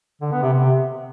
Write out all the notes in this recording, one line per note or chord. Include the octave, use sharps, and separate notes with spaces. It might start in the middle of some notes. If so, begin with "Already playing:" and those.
D3
B3
C3
C3